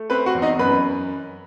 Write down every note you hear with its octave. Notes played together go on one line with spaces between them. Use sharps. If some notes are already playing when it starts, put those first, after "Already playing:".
Already playing: A3
C4 B4 B5
F#4 F#5
E2
D#4 D#5
F#2 B4 B5